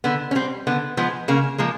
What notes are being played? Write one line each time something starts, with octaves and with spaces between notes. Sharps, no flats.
D3 B3
C#4
G3 C4
D3 B3
F3 G#3 B3
C#3 A#3
F3 G#3 A#3